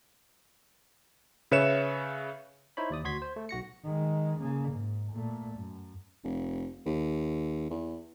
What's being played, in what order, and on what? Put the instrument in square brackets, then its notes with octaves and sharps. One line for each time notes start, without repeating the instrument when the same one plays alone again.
[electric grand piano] C#3 B4 C#5 E5 C#7 E7
[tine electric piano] D#4 E4 C5 C#5 B5
D#2 D5 D#6
D2 F#4 C6 G#6 B6
C5
A3
B1 F#4 A#6 C#7
[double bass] D#3 G#3
C#3 A#3
G#2
A#2 A3
F#2
[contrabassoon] F1
D#2
E2